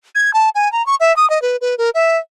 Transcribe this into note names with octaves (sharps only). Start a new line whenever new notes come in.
G#6
A5
G#5
A#5
C#6
E5
D#6
D#5
B4
B4
A#4
E5